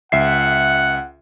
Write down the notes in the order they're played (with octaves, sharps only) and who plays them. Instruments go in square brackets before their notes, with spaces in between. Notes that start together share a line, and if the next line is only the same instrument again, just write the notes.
[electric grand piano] C#2 E5 C7 [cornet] F#5